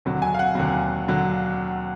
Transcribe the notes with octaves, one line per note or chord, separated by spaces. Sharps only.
D#2 D3 F#3
G#5
F5
F#5
D#2 D3 F#3
D3 F#3